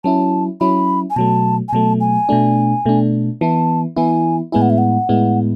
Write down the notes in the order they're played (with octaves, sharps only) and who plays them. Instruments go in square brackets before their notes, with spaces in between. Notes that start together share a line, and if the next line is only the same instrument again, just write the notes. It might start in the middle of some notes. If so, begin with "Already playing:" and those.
[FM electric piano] F#3 C#4 E4 [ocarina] A5
[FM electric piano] F#3 C#4 E4 [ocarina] B5
[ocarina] G#5
[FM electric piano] B2 F#3 A3 [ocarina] A5
[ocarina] G#5
[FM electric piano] B2 F#3 A3 [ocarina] A5
[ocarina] G#5
[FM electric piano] B2 A3 D4
B2 A3 D4
[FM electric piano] E3 B3 E4 [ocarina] A5
[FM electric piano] E3 B3 E4 [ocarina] G#5
[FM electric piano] A2 G#3 B3 E4 [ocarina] G#5
[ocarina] F#5
E5
F#5
[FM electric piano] A2 G#3 B3 E4